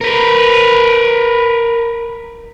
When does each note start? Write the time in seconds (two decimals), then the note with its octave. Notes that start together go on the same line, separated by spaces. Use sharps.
0.01 A#4 B4